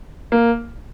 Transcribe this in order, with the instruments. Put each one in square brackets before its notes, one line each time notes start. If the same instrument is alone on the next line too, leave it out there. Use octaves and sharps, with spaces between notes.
[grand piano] A#3